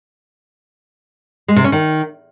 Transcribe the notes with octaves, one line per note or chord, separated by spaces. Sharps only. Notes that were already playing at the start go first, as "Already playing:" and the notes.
G#3
C3
C#4
D#3